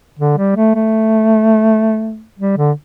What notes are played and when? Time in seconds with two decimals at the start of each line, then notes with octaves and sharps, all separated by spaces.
0.19 D3
0.37 G3
0.56 A3
0.75 A3
2.39 G3
2.57 D3